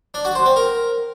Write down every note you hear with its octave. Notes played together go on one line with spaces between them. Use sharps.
D4
F#4
C5
C4
A#4